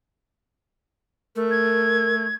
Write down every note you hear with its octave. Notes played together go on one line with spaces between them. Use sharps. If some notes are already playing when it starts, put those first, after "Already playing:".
A3 A#4
G#6